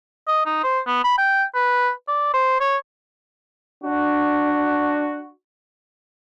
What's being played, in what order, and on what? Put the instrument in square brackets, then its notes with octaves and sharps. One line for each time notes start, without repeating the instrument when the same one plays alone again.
[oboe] D#5
D#4
C5
B3
B5
G5
B4
D5
C5
C#5
[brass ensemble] D4 F#4